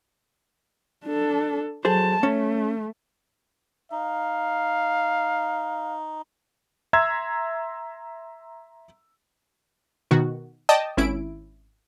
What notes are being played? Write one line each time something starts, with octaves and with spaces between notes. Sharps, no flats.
D4 A4
F#3 G#4 A4 C5 A5
A3 C#4
D#4 F5
E5 A#5 C6 E6 G#6
B2 D#3 F#4
D5 D#5 G5 A5 D#6
G#1 C#4 E4 D7